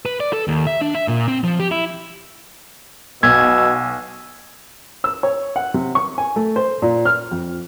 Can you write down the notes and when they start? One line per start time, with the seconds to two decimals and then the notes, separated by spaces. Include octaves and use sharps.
0.06 B4
0.20 D5
0.33 A4
0.48 D#2
0.67 E5
0.81 D4
0.95 E5
1.08 A#2
1.28 C4
1.44 F3
1.59 G4
1.71 E4
3.23 B1 B2 E6 G#6
5.04 E6
5.23 C#5
5.56 F#5
5.74 C3
5.95 C#6
6.18 G#5
6.36 A3
6.56 C5
6.82 A#2
7.05 F6
7.31 F2